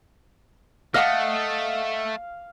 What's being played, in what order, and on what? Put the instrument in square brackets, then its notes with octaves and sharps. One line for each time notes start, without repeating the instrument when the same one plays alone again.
[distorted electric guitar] A3 [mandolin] D#5 F#5 D#6 [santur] F5